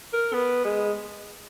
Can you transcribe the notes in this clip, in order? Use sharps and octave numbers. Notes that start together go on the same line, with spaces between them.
A#4
B3
G#3